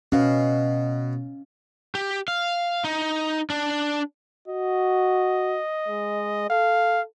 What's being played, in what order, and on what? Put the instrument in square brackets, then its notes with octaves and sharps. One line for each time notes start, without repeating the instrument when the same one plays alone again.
[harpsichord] B2 [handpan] C#4 F5
[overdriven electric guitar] G4
F5
D#4
D4
[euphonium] F#4 [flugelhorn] D#5
[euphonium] G#3
[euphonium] A4 [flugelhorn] F5